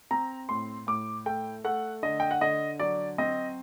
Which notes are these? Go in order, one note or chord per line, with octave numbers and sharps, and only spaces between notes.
C4 A#5
A2 C6
A2 D6
A3 G5
A3 F#5
D3 D#5
G5
F#5
D3 D#5
F#3 D5
C4 D#5